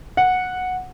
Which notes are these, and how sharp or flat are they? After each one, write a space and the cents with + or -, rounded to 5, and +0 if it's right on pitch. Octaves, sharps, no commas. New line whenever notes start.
F#5 -10